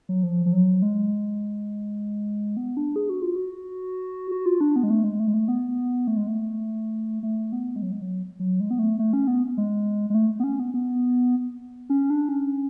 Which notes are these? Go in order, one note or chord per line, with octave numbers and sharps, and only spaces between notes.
F#3
F3
F3
F#3
G#3
B3
D4
G#4
F#4
F4
F#4
F#4
F4
D4
B3
G#3
A3
G#3
A3
G#3
A3
B3
A3
G#3
A3
A3
B3
G#3
F#3
G#3
F#3
F#3
G#3
B3
A3
A3
C#4
B3
G#3
G#3
A3
B3
C#4
B3
B3
C#4
D4
C#4